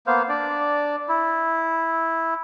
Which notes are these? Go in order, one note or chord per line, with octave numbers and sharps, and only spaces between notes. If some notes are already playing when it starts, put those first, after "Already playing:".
A#3 B3 C5 F5
D4 D5
E4